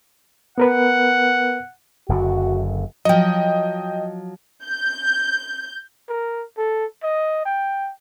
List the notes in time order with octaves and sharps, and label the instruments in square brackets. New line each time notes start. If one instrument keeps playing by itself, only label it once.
[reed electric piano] B3 A#4 B4 [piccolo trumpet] F#5
[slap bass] F#1 F#2 D3 [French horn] F#4
[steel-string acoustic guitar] F3 F#3 [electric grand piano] D#5 G5
[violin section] G6
[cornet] A#4
A4
D#5
G5